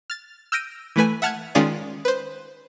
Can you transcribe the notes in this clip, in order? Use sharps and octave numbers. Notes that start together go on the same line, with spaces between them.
F6 A6
E6 F6 G6 A#6 D7 D#7
E3 A3 B4 G#5
E5 F#5 A5 F6 F#6 G#6
D#3 G#3 C#4 F4 G#4 D5
B4 C5